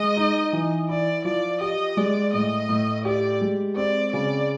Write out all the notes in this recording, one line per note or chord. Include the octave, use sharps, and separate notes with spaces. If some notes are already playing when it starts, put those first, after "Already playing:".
Already playing: G#3 D#5
D#4
E3
E4 D5
F3 D5
G4 D#5
G#3 D5
A2 D#5
A2
G4 D5
G#3
C4 D5
C#3 D5